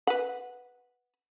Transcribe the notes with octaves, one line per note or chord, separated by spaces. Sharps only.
B4 F#5